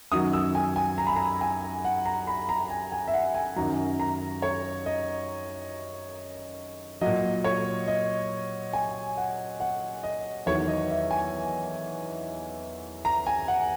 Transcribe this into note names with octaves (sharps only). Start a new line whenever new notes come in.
F#2 D#3 F#3 D#6
E6
G#5
G#5
A#5
B5
A#5
G#5
F#5
A#5
B5
A#5
G#5
G#5
E5
F#5
G#5
F#2 D#3 F#3 A#5
A#5
C#5
D#5
A#2 F#3 D#5
C#5
D#5
G#5
F#5
F#5
D#5
E2 D#3 F#3 C#5
D#5
E5
G#5
A#5
G#5
F#5